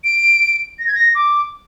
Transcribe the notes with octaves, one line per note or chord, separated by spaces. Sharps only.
D7
A#6
G#6
A#6
D6